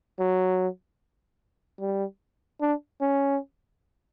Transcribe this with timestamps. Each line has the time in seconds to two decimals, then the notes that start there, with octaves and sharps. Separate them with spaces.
0.19 F#3
1.80 G3
2.61 D4
3.01 C#4